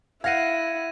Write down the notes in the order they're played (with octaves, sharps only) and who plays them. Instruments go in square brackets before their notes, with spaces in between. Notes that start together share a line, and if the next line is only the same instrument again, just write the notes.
[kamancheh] E4 [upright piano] F5 F#5 [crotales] G#6 A#6 D#7